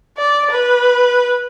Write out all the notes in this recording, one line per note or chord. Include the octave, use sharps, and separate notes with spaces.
D5
B4